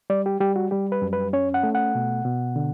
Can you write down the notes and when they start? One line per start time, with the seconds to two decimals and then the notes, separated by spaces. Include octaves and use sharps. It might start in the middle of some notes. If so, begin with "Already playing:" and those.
0.10 G3 D5
0.26 G4
0.40 G3 G4
0.56 F#4
0.71 G3 G4
0.92 B4
1.02 F#2
1.13 B4
1.33 C#4 C#5
1.54 F#5
1.63 A3
1.75 F#5
1.95 B2
2.25 B2
2.56 D3